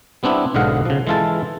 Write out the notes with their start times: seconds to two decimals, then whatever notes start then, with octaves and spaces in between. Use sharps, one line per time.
0.23 G3 B3 C4 D4 E4
0.54 B1 G#2 D3 D#5 F5 F#5
0.85 C#3 F3
1.07 E3 G#3 E4 F4 A4 A5